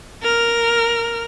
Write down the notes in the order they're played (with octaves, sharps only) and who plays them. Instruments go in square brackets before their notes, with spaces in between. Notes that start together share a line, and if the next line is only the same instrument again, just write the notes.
[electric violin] A#4 F6